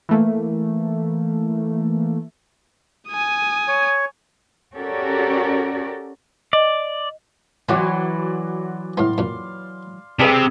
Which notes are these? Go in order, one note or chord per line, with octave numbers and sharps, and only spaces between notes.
E3 A3 A#3
G#5 D#6
C#5
C#4 F#4 G4 A4 A#4 D5
D5 D#5
E3 F#3 B3 F4 F#4 D5 C6
A2 B3 F5 C6
F#2 A#2
C3 G3 D4 G#4 B4 F5 E6